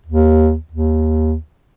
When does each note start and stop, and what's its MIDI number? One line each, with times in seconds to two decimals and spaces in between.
0.06 0.56 39
0.72 1.35 39